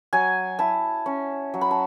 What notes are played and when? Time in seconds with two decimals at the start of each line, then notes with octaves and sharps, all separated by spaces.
0.13 F#3 G#5
0.59 E4 A5
1.06 C#4
1.54 F#3
1.61 B5
1.71 A5